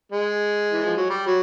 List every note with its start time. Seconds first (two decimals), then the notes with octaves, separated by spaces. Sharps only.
0.12 G#3
0.72 E3
0.85 F3
0.97 F#3
1.10 G3
1.27 F#3